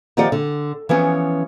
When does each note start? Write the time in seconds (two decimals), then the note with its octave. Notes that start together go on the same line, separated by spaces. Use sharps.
0.17 D#3 F3 F4 G4 D5 F#5
0.32 D3
0.89 E3 F3 B3 C#4